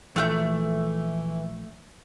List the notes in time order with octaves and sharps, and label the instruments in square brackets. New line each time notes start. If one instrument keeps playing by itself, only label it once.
[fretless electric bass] A#1 [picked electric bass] E3 [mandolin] A3 F#5 G6